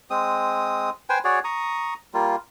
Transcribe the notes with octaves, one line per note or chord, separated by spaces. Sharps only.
G#3 C4 D#6
B4 C5 G5 G#5
F#4 G#4 C#5 D5
A#5 C#6 D#6
G3 A#3 F4